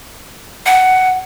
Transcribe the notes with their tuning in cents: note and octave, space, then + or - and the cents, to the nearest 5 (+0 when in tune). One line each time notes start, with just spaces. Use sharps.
F#5 +10